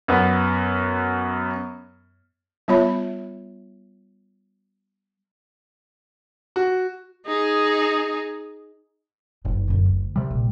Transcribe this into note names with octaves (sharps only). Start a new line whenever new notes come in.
F#2 B3
G3 B3 F4 C#5 E5 B5
F#4
D#4 G#4
F#1 G2 D#4
F#2 D3
D2
C3 G3
A#1